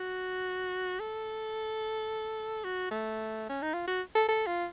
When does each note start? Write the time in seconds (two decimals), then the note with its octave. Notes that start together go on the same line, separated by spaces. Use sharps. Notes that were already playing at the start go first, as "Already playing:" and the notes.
Already playing: F#4
1.00 A4
2.64 F#4
2.91 A3
3.49 C#4
3.62 D#4
3.74 F4
3.87 F#4
4.15 A4
4.29 A4
4.46 F4